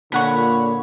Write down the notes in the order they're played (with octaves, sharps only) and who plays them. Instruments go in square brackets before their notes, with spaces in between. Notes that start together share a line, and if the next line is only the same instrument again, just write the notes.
[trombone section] A#2 D3 [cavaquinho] C#5 F#5 B5